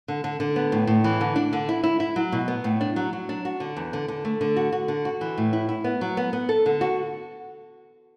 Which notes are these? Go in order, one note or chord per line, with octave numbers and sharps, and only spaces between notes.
D3
D3
D3
B3
A2
A2
E3
D3
D4
D3
E4
E4
E4
F#3
B2
B3
A2
D4
F#3
F#3
D4
F#4
D3
E2
D3
D3
A3
D3
F#4
F#4
D3
F#4
E3
A2
E4
E4
B3
F#3
B3
B3
A4
D3
F#4